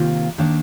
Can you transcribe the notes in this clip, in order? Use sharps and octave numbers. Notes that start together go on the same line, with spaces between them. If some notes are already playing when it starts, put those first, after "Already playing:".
Already playing: C3 D#3 A#3 F4
D#3 A#3 D4